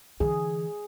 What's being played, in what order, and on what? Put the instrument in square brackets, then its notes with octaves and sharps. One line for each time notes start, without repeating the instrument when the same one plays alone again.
[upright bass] D3 E3 [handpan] G#4